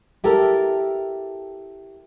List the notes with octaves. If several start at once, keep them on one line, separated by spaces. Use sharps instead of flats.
E4 G4 A4 A#4